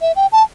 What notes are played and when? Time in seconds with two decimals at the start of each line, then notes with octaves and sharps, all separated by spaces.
0.01 E5
0.16 G5
0.32 A5